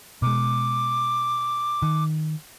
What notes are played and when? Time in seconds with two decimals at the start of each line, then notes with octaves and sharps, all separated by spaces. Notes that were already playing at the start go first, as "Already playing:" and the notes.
0.22 B2 G#3 D6
1.82 D#3